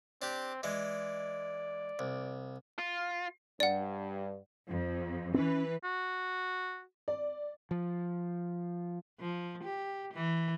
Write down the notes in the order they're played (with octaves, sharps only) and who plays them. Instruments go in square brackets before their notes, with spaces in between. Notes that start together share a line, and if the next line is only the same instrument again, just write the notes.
[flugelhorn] C4 [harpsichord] D4 G4
[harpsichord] E3 G#3 [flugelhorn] D5
[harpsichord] C2
[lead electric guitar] F4
[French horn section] G2 [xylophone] D5 F#5
[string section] F2
[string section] E3 B4 [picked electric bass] C4 C#4
[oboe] F#4
[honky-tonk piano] D5
[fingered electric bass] F3
[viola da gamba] F3
G4
E3